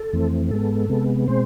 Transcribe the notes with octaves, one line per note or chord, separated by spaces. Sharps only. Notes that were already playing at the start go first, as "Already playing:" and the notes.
Already playing: A4
F2 E3 A3 C4
G#2 G#3 B3 A4
C3 G#3 B3
B2 G#3 C4 C5